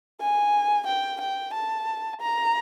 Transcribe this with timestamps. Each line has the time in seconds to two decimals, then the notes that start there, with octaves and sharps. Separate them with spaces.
0.21 G#5
0.87 G5
1.21 G5
1.54 A5
2.21 A#5